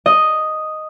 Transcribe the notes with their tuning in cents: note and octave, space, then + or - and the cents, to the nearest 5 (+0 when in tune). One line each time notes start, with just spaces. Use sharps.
D#5 +0